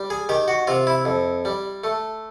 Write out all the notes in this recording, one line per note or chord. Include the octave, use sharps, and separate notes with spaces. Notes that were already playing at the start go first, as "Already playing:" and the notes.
Already playing: G3
G#4
D#3 G4
F#4
C3 F4
E4
F2
G3
A3